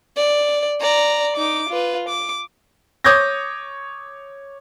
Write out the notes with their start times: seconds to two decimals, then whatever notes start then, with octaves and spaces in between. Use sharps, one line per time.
0.17 D5
0.81 D5 A#5
1.36 D#4 D6
1.70 F4 B4
2.09 D6
3.04 C#5 D6 D#6 G6 G#6 A#6